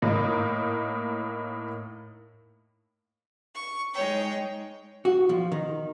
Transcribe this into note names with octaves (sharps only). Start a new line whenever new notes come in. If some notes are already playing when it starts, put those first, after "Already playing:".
A2 A#3 D#4
C#6
G#3 D#4 C#5 G5
F#4
F3
D#3